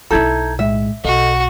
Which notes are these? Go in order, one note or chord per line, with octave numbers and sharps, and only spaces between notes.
B1 D#4 E4 A4 A#5 G6 G#6
A2 G#3 E5
B1 F#4 A4 D#5